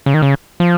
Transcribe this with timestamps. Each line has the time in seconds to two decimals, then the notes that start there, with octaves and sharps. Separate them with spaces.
0.06 C#3
0.14 D#3
0.22 C#3
0.60 F3